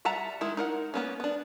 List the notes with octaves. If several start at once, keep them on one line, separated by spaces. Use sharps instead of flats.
G3 E5 F#5 A5 A#5
D#3 G#3 E4
D#4 A#4 F#5
A#3 B3 C#4
B3 D4